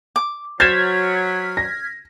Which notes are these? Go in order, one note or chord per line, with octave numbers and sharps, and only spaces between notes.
D6
F#3 C5 F6 G#6 A6 B6 E7
A#6